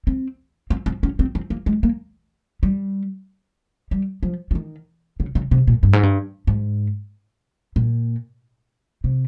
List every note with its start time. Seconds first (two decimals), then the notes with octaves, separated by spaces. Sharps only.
0.07 C4
0.70 C4
0.86 C4
1.03 C#4
1.19 C4
1.35 C4
1.50 A#3
1.66 G#3
1.83 A#3
2.63 G3
3.91 G3
4.23 F3
4.51 F3
4.55 D#3
5.20 C#3
5.35 C#3
5.51 C3
5.67 A#2
5.83 G2
5.93 G#2
6.03 G2
6.47 G#2
7.76 A#2
9.04 C3